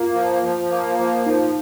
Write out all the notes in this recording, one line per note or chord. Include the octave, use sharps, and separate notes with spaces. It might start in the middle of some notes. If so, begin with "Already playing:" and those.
Already playing: A#3 F4
F3
F3
A#3
F3
F3 D#4